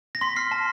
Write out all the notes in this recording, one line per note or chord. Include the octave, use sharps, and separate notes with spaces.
A#6
C6 B6
F6 C7
A5